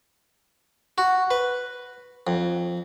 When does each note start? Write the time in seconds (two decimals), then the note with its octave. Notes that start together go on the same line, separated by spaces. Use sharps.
0.98 F#4
1.31 B4
2.27 F2